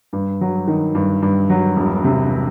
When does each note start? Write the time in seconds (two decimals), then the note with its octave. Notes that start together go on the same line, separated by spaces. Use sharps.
0.13 G2
0.41 F#3
0.68 D#3
0.95 G2
1.22 G2
1.50 F#3
1.76 E1
2.04 C3